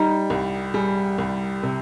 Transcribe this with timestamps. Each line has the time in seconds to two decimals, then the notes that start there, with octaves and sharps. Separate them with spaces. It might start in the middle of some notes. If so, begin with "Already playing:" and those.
Already playing: G3 D#4
0.30 C2
0.74 G3 G#4
1.18 C2
1.63 C3